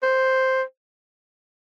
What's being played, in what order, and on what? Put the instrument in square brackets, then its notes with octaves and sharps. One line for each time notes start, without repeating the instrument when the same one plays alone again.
[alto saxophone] C5